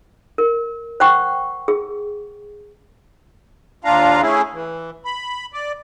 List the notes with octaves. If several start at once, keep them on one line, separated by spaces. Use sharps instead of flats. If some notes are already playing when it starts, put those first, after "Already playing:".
A#4
C5 F#5 G5 C#6
G#4
D#2 D4 F4 F5 A#5
A3 C#4 E4 G#4
E3
B5
D5